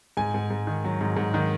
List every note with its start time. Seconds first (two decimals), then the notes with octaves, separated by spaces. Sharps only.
0.17 G#2 G#5
0.34 G#2
0.50 G#2
0.67 D#3
0.84 F#3
1.01 G#2
1.17 G#2
1.34 D#3